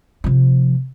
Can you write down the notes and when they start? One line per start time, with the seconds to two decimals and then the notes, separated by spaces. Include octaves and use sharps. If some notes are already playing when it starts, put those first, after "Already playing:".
0.24 C3 F3